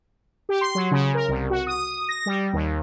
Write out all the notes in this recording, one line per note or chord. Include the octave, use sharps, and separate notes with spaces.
G4
C6
F#3
C#3
A#4
C2
F#4
D#6
A#6
G3
D#2